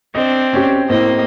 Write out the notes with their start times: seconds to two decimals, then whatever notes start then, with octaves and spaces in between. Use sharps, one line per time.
0.15 C4 D4 D#5
0.53 C#4 G4
0.89 A2 A#3 C4 D#5